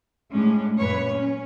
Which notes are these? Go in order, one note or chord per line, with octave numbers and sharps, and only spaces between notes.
A2 G#3 C#4 D4
F#2 A#2 B4 C#5
C#4